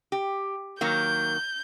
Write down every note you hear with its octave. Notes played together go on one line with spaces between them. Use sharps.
G4
D#3 F#3 A#3 G6